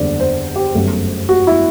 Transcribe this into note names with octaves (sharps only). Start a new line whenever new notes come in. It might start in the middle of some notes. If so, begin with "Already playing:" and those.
Already playing: F#1 E2 D3 G3 D5
C5
G4
G1 F#2 F#3 A3
F#4
E4